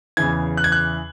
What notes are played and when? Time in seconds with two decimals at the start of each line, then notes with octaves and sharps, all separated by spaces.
0.17 E2 C#3 E3 G#6
0.57 F#6
0.64 G#6
0.72 F#6